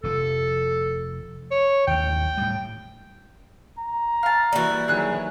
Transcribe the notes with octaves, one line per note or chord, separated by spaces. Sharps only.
F1 F3 A4
C#5
A1 D#2 G5
A2 G3
A#5
F5 A5
E3 G3 A#3 F#4
D#3 E3 F#3 G#4 F#6